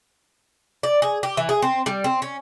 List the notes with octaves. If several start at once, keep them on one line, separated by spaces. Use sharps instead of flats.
D5
G#4
G4
E3
G#4
C4
G3
C4
C#4